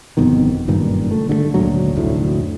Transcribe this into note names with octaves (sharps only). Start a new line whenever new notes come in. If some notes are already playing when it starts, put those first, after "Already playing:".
G1 F2 B2 D#3
F#1 G2 A#2 D#3
A3
D3 G3 A3
G#1 D2 A#2 F#3
F1 D2 A2